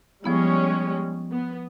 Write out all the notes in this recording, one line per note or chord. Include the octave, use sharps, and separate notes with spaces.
F3 G3 G#3 B3 C#4 E4
B3